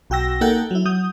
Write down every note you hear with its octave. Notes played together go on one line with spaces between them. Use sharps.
B1 F#4 G5 E6 A#6
A#3 D#4 A4 F#5 G5 G6
F#3 E4
F#3 D#6 G6